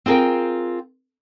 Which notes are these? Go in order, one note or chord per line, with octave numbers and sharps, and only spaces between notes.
C4 F4 G#4 A#4 G5